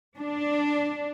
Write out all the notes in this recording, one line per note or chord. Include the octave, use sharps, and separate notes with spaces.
D4